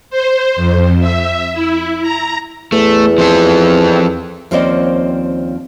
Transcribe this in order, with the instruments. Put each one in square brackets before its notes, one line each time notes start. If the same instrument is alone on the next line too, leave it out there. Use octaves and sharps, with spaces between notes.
[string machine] C5
F2
E5
E4
A#5
[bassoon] E2 [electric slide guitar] A3
[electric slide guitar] F3 C4 A4
[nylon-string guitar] D#2 F3 C4 C#4 D5 D#5